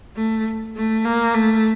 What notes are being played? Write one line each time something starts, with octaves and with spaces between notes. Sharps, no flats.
A3
A3
A#3
A3